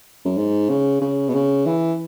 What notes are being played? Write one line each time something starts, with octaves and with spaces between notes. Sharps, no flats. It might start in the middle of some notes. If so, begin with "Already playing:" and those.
F#2
G#2
C#3
C#3
B2
C#3
E3